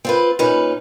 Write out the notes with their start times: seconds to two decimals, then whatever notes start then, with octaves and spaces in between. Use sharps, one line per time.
0.05 C4 F4 B4
0.39 A#2 C#4 D#4 B4